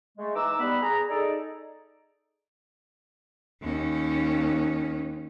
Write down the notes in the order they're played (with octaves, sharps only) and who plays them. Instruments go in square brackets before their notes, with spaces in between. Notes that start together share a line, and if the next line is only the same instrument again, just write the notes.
[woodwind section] G#3 A3
E3 D#4 B4 A#5 D6 E6
G3 B3 B4 B5
G#4 A#5
D#4 G#4 A4 D5
[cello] D#2 C#4